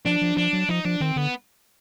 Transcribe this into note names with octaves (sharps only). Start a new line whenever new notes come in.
F3 D4
F3
F3 D4
F#3
F3 D#4
F3 D4
D#3 C4
D3 B3